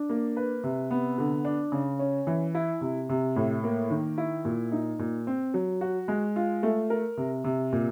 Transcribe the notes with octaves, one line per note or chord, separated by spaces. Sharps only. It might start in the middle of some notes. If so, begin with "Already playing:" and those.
Already playing: D4
A#3
B4
C3
B3
D3
D4
C#3
C#4
E3
E4
C3
C3
A2
A#3
D#3
E4
A#2
D#4
A#2
C4
F#3
F#4
G#3
F4
A3
A#4
C3
C3
A#2